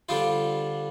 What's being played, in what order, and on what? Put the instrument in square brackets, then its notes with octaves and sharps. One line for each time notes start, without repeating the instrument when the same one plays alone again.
[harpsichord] D3 G3 D4 F4 C5